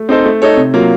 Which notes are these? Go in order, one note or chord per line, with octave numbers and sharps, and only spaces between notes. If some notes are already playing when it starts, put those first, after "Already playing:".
Already playing: A3
C4 D#4 A4 C5
A3
D#4 A4 C#5
C3
F#3 A#3 F4